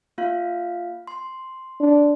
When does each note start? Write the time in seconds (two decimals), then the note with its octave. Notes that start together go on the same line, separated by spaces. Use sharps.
0.18 A#3 F4 F5
1.07 C6
1.80 D4